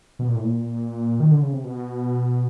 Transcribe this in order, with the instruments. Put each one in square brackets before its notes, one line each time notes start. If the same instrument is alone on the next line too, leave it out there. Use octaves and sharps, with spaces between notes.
[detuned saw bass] B2
A#2
A2
A#2
D#3
D3
C#3
C3
B2